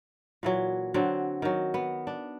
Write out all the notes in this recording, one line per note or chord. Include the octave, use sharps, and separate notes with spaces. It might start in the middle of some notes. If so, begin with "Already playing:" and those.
A#2 E3 F#3
D3 F#3 C4
D#3 F#3
B3
D4